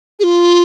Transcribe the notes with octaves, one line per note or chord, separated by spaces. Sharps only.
G#4
F4